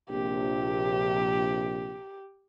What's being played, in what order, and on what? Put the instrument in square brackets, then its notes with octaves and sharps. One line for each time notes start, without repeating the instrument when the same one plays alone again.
[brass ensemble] A#1 C3 [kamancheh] G4